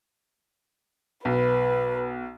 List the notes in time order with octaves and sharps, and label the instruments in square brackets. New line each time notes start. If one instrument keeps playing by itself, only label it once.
[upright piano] B1 [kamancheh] B4